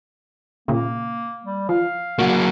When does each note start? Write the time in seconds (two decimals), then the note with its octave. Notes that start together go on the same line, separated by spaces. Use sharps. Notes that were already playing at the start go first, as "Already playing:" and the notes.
0.68 A#2 C#3 A#3
1.45 G3
1.69 F3 F5
2.19 F#3 A#3 F#4